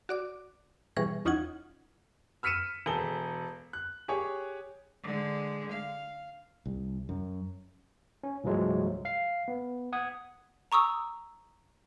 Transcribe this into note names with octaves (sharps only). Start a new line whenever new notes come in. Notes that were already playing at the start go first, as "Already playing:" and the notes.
F#4 D5 D6
B2 E3 G3 G#4 C#6 A#6
E2 C#4 D#4 F4 F#5 G#6
E6 F6 B6 C#7 D#7 E7
E1 G#4 A4 G7
F#6
G4 G#4 C#5
D3 G#3
F5
C2
F#2
C#4
C2 G2 F3 F#3 G#3 A3
F5 C7
B3
F#5 D#6 G#6
A#5 C#6 D#6 E6